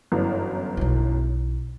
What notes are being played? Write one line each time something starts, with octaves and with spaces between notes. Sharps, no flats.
G1 F#2 E3
B1 E4